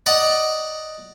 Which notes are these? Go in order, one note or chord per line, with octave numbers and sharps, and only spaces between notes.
D5 D#5 F#5 A#5